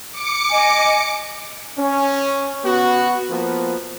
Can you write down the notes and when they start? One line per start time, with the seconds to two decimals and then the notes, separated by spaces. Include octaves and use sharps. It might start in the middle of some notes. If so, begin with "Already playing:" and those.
0.11 D6 C#7
0.50 D#5 G#5
1.78 C#4
2.65 B3 F#4
3.30 F3 A#3 B3